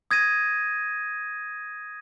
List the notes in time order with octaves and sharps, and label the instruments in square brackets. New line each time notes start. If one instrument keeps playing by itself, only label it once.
[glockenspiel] D#6 G#6 A#6 D#7